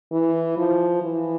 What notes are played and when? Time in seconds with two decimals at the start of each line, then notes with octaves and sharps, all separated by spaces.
0.12 E3
0.57 F3
1.02 E3